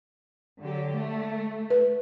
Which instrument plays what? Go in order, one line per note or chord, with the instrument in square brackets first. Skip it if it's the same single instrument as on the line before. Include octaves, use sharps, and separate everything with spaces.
[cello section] D3 F#3 G4
A3
[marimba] B4